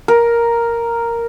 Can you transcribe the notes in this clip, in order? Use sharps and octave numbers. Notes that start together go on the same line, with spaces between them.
A#4